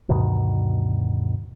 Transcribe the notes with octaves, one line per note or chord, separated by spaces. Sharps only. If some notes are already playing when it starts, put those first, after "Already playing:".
D2 G2 B2 D#3